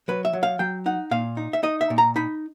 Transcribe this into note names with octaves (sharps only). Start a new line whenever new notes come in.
F#3 B4
E5
F#3
F5
F#3 G5
D#4 F#5
A#2 F5
D#4
E5
D#4 D#5
E5
A#2
A#5
D#4 B5